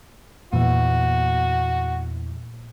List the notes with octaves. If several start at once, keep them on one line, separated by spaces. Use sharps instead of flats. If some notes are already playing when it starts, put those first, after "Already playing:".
E2 A#2 E3 F#4